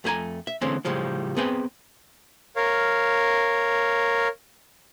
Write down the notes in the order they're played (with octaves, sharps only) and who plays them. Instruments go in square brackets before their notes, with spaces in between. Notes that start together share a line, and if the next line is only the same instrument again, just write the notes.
[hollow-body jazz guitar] F2 A3 D#4 G#5 A#5
E5
D3 E3 G#3 A3 C4 C#4
A2 C#3 F3 G3 G#3
B3 C4 G#4 B4 G5
[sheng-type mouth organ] A#4 C#5 F5